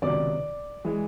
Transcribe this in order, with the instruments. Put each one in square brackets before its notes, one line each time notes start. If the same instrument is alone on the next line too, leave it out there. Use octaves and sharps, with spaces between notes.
[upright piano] C#2 C3 D#3 F#3 B3 D5 D6
E3 G#3